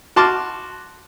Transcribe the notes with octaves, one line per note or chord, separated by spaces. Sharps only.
F#4 A5 C6 D6 F6